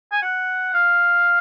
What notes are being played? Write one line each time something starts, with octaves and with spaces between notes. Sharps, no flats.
G#5
F#5
F5